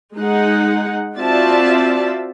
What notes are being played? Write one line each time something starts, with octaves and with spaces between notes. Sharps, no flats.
G#3 D#4 G#4 F#5
C4 F4 F#4 D5 E5 A5